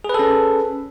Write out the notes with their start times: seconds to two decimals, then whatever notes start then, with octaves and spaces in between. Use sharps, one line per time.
0.04 G#4
0.09 B4
0.14 A4
0.19 C#4